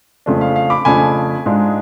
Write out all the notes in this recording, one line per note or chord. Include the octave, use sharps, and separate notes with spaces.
F2 C#3 F3 A3 D4
F5
F5
B5 D6
F2 C#3 F3 A3 D4 G#5 B5
G#2 G#3 D4 F4